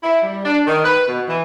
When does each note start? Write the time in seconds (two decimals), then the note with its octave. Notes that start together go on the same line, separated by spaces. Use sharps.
0.03 E4
0.22 G3
0.44 D4
0.66 D#3
0.84 B4
1.07 B2
1.28 E3